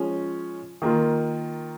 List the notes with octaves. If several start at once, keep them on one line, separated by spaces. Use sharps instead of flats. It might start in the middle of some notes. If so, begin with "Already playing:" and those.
Already playing: F3 G#3 C#4
D#3 A#3 F4